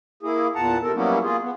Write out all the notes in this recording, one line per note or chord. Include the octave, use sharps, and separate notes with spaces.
A#3 E4 G#4
E2 A#2 F#5 A5 A#5
C3 A4 A#4
F#3 G3 A#3 B3 C#4 E4
A#3 F4 G#4
B3